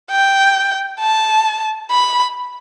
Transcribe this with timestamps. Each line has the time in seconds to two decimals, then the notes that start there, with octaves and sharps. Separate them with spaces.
0.11 G5
1.00 A5
1.91 B5